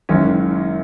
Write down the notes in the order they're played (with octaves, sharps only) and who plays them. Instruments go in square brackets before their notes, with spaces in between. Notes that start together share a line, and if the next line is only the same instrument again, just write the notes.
[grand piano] F#1 F#2 D#3 G#3 C#4